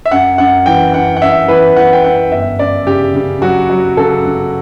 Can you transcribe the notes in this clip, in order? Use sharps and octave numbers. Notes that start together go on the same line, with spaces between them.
E5
F#2 F#5
F#2 F#5
E3 G5
F#2 F#5
F#5
F#2 E5
E3 B4
E3 F#5
G5
F#2 F#5
G1 E5
F#2 D5
C#3 G4
C#3
F#3 F#4
F#3
C#3 A4
C#3